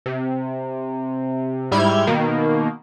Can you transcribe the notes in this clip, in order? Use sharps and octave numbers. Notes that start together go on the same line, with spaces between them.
C3
G#2 G3 E4 F6 G6 G#6
B2 D#3 A#3